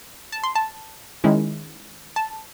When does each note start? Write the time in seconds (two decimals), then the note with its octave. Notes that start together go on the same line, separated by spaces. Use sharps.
0.32 A5
0.44 C6
0.55 A5
1.24 D#3 G#3 C#4 E4
2.16 A5